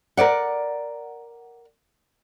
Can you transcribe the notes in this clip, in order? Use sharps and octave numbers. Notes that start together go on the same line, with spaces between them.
A#4 C#5 D5 F#5